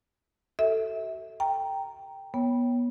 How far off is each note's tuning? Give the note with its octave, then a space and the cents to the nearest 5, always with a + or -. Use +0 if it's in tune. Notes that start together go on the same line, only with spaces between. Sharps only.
F#4 +40 A4 +15 E5 -25
G5 +0 A#5 +0
B3 -25 C#5 +0 G5 +0